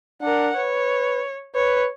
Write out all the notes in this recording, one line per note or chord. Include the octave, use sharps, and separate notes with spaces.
D4 A#4 F#5
B4 C#5
B4 C#5